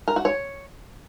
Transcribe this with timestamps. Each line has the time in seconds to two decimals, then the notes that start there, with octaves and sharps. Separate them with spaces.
0.08 A#4
0.16 F#4
0.25 C#5